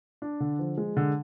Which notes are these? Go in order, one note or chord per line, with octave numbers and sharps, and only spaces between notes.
D4
D3
F3
G#3
D3